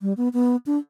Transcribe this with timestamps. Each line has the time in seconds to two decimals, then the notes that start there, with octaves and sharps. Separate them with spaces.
0.02 G3
0.17 B3
0.33 B3
0.66 D4